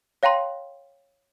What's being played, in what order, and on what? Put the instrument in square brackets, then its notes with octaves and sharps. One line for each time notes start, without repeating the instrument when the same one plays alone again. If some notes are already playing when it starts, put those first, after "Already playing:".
[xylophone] C#5 F5 G5 A#5 C6